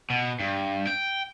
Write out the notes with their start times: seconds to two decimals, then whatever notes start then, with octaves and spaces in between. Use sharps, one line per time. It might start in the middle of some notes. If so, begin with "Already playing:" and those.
0.10 B2
0.40 G2
0.87 G5